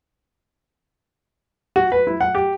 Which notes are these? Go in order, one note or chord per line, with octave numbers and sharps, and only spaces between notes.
F#4
B4
E4
F#5
G4